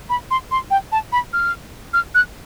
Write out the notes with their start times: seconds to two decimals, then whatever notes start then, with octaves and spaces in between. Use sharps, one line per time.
0.10 B5
0.31 C6
0.51 C6
0.71 G5
0.92 A5
1.12 B5
1.33 F6
1.93 F6
2.15 F#6